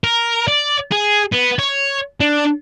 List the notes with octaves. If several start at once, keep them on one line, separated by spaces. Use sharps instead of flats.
A#4
D5
G#4
B3
C#5
D4